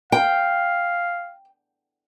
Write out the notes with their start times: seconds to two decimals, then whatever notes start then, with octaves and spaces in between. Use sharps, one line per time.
0.12 F5 G5